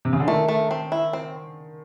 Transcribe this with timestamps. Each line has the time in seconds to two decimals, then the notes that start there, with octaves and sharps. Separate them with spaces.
0.05 C3
0.13 C#3
0.20 D3
0.28 D#3 A3
0.48 A3
0.71 C4
0.92 E4
1.13 C4